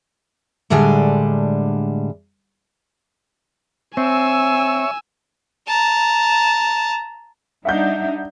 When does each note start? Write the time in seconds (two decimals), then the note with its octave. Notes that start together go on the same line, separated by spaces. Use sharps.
0.70 A2 D3 G3 G#3 D4 G#5
3.97 C4 C#5 E5 G#5 E6
5.68 A5 A#5
7.65 G3 D4 D#4 E5 F#5 G6